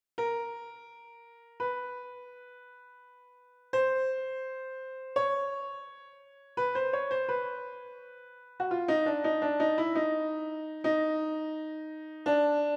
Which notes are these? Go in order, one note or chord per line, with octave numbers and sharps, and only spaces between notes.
A#4
B4
C5
C#5
B4
C5
C#5
C5
B4
F#4
F4
D#4
D4
D#4
D4
D#4
E4
D#4
D#4
D4